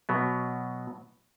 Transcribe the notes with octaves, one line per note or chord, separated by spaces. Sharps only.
B2 F#3 B3